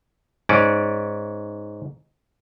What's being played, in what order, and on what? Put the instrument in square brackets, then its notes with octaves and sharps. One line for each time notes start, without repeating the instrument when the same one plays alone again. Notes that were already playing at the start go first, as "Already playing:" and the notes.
[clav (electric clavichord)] G#2 C#4 D5